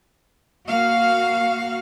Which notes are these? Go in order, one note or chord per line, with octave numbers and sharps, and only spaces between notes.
A#3 F#4 F5